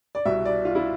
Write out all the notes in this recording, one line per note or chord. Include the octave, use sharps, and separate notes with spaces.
D5
C2 B2 E5
D5
F4
E4